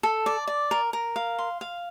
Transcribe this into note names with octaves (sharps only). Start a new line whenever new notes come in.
A4
D5
D5
A#4
A#4
F5
C6
F5